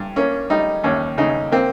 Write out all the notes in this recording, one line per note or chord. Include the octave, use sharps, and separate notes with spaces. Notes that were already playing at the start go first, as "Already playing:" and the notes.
Already playing: G2
A#3 C#4
G3 D#4
D#2 C#4
C#3 D#4
A#3 C4